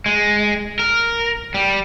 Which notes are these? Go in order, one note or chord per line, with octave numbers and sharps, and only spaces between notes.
G#3
A#4
G3